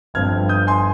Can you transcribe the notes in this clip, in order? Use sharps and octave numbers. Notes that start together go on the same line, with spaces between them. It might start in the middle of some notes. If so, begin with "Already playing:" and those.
G1 G2 F3 C4 F6 G#6
D#6 G6
G#5 C6